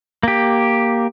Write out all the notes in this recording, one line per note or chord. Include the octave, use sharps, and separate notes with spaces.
A#3 G4